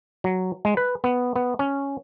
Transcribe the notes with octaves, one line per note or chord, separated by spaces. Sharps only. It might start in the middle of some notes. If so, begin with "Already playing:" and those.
F#3
G#3
B4
B3
B3
C#4